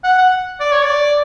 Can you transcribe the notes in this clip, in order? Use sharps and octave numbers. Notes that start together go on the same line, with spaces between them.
F#5
F#5
D5
C#5
D5